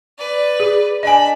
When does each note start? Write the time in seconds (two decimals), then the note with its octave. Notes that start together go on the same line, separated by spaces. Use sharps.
0.18 B4 D5
0.60 G#4
1.03 D4 D#5 G#5 B5